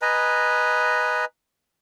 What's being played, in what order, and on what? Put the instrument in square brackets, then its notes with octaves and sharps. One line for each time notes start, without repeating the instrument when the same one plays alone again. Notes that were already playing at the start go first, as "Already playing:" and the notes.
[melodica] B4 D#5 G#5 A#5